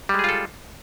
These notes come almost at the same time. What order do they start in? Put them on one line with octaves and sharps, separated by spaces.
G3 G#3 G#4 F4 A4